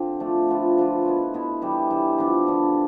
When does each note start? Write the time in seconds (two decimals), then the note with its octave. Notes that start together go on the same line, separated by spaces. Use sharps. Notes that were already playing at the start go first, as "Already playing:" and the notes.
Already playing: D3 C4 F4
0.20 F3 A3 D4 A4
0.49 D3 F3 B3 F4
0.77 D3 F3 B3 F4
1.05 B2 B3 E4
1.34 B2 B3 E4
1.62 E3 G3 D4 G4
1.90 E3 G3 D4 G4
2.18 D3 F3 B3 D4
2.46 D3 F3 B3 D4